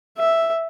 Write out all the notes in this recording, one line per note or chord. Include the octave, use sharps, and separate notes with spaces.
E5